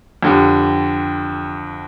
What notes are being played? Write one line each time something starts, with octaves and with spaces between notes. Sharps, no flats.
F2 D3 G3